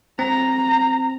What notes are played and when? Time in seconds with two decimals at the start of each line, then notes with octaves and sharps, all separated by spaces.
0.19 C4 A#5